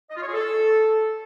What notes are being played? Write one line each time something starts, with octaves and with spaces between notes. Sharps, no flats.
D#5
F4
C#5
G#4
A4